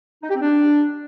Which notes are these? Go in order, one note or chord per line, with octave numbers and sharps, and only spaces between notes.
D#4
G4
C4
D4